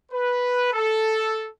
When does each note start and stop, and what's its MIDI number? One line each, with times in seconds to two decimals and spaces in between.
0.12 0.72 71
0.73 1.48 69